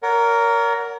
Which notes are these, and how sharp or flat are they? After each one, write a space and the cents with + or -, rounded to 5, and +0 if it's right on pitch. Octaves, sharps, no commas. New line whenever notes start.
A#4 +0 C#5 +40 F#5 -5